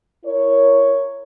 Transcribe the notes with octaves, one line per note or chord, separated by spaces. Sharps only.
E4 A#4 C#5